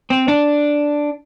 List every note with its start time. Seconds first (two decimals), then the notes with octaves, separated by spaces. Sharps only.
0.10 C4
0.28 D4